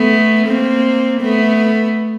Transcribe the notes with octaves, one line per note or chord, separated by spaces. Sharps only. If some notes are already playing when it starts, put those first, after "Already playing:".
Already playing: A3 B3
A#3 C4
A3 B3